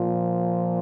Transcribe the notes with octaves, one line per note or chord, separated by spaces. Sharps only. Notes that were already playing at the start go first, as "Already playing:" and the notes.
Already playing: A#2 F3